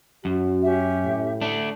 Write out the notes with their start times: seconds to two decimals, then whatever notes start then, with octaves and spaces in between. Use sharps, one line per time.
0.25 F#2 F#4
0.63 C#4 G4 E5
1.04 A2
1.41 A3 D4